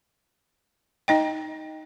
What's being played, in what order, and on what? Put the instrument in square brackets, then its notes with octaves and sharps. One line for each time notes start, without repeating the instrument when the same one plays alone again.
[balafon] D#4 D#5 G5